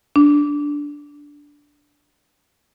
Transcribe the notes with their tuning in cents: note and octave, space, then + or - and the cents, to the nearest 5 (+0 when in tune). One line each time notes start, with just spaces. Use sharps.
D4 -10